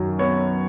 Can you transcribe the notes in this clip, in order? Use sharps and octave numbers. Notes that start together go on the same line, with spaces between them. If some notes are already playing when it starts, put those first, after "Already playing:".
Already playing: F#2 D#3 F#3
B3 C#5